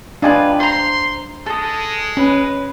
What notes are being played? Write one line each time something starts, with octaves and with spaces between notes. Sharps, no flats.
D4 F4 G4 B4 D#5 G#5
C5 A#5 C6
G#3 A4 D#6
C#4 B4